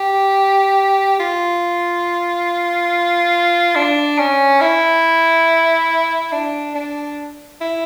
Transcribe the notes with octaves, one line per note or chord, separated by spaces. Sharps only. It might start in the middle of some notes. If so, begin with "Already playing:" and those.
Already playing: G4
F4
D4
C#4
E4
D4
D4
E4